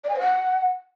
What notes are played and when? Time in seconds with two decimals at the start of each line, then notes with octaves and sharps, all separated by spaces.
0.04 D5
0.09 G#5
0.14 C5
0.19 F#5